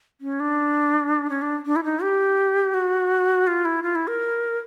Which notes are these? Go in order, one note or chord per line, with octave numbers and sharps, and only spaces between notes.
C#4
D4
C#4
D4
D4
E4
D#4
G4
F#4
F4
E4
F4
E4
A#4